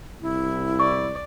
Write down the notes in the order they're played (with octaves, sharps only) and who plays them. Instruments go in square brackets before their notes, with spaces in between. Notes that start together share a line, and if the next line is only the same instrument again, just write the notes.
[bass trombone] C2 [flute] E4
[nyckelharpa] D5 [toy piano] C#6